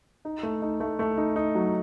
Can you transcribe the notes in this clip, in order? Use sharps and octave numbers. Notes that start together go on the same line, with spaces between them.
D#4
A3
D#4
A3
A3
D#4
D#4
F#3